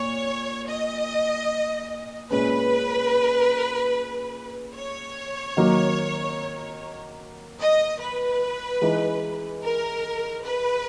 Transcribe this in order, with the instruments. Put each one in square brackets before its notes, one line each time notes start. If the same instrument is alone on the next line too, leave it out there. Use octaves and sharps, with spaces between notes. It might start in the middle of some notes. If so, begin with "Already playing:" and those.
Already playing: [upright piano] A#2 [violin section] C#5
[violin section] D#5
[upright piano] A#2 G#3 C#4 [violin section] B4
[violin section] C#5
[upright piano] D#3 F#3 A#3
[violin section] D#5
B4
[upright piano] E3 G#3 D#4
[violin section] A#4
B4